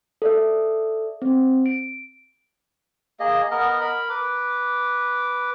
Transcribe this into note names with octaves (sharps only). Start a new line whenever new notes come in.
A4 D5 E5
C4
D7
A#3 G#4 D#5
B3 A#4 D#5
A#4 B5
B4 D6